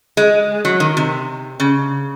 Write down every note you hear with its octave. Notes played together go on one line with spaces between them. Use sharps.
G#3
F#3
D#3
C3
C#3